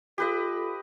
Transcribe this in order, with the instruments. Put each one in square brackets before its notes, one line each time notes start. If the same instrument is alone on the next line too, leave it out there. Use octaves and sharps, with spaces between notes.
[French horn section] F4 A4 [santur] G4 B4 D#5